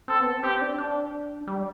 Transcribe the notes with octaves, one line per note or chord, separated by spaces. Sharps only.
C4 A4
B3
C4
C4 G4
D4
D4
G3